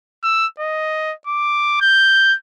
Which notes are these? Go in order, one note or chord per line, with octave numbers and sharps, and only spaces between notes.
E6
D#5
D6
G6